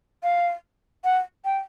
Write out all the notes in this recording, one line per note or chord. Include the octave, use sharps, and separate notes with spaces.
F5
F#5
G5